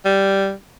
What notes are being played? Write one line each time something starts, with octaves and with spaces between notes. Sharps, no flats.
G3